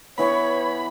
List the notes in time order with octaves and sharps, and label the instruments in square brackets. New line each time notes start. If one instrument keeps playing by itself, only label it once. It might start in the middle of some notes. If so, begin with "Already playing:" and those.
[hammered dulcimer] E3 B3 [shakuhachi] C#5 [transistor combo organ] B5